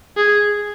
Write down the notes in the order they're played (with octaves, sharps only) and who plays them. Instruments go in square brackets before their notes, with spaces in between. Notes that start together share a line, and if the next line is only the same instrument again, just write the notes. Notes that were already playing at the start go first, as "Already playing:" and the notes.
[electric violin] G#4